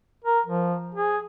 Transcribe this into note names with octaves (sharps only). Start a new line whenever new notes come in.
A#4
F3
G#4